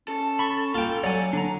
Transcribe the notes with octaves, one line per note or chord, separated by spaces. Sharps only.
C#4 A4
B5 C#6
A#3 F4 G5
F#3 D5 G#5
D3 D4 A#5